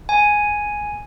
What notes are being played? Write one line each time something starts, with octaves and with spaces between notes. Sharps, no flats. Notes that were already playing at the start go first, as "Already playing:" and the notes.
G#5